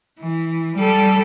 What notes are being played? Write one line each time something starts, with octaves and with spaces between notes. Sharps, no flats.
E3
G3 A4